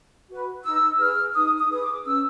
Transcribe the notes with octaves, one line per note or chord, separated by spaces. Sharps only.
F#4 B4
D#4 E6
G#4 B4 F6
D#4 D#6
D#6
G#4 B4 D#6
D6
C#4 E6